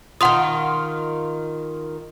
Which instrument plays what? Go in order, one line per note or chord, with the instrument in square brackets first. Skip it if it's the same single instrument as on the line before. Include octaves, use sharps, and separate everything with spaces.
[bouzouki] D#3 F4 [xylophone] F#5 C6 D#6